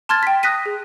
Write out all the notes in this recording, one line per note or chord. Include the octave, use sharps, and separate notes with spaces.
A5 C6 F6 G#6 A6
G5 B6
D#6 F#6 A#6 B6 D#7
G#4